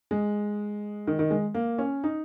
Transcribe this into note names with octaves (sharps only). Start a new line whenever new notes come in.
G#3
D#3
D#3
G#3
A#3
C#4
D#4